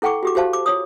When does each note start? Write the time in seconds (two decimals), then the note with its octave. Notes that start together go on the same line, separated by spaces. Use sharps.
0.02 E4 A4 F#5 G5 C#6 D6
0.23 F#4 G4 D6
0.35 F#4 G4 C5 F5 A5
0.53 D6
0.66 F4 C#5 D#6